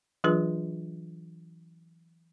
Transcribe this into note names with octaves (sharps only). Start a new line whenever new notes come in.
E3 F#3 D4 F4 G#4 B4